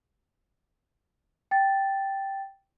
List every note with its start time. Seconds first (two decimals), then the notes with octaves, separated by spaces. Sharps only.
1.51 G5 A6